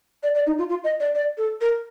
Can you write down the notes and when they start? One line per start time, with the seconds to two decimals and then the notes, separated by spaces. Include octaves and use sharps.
0.23 D5
0.35 D5
0.47 D#4
0.58 F4
0.69 F4
0.84 D#5
1.00 D5
1.15 D5
1.38 A4
1.61 A#4